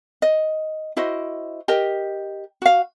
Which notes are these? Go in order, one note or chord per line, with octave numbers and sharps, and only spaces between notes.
D#5
E4 F#4 C5 D#5
G4 A#4 D#5
F#4 F5